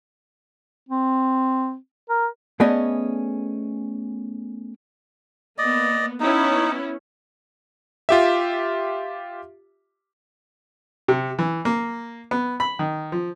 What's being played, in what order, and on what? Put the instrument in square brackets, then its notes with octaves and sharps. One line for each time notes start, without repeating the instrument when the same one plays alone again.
[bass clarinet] C4
A#4
[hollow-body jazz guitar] A3 B3 C#4 G#4 D5 D#5
[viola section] A#3 B3 [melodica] D5 D#5
[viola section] B3 C#4 E4 [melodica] D#4
[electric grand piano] F4 G4 E5
[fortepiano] C3
E3
A#3
B3
B5
D#3
F3